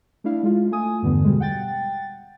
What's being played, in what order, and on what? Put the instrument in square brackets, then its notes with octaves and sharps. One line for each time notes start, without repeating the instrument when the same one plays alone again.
[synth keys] A3 D4 E4 F5
G#3 A3 F4
A3 G#5 D#6
E2 G2 D3 B3
B2 G3 G#3
F#5 G5 A6